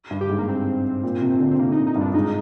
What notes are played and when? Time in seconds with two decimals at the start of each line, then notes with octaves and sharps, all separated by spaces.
0.11 G2
0.21 G4
0.29 G#2
0.39 A#3
0.48 C4
1.04 A#2
1.21 C3
1.40 D3
1.51 C4
1.58 C3 A#3
1.72 A#2 D#4
1.87 D#4
1.95 G2
2.01 D4
2.14 G#2 D#4